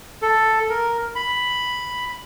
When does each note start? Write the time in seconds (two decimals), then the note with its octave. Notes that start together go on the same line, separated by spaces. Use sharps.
0.22 A4
0.70 A#4
1.15 B5